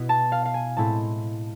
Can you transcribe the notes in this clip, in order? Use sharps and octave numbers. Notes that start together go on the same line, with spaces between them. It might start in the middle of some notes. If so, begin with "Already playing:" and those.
Already playing: B2 B3 E4
A5
F5
F5
G#5
A2 G#3 C4 E4 A5